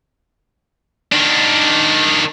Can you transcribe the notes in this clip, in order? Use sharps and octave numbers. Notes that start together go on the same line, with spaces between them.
D#3 D4